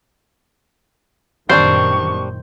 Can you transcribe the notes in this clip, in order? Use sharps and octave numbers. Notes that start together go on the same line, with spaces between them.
F#1 A#2 D#3 G3 C4 D4 C5 C#6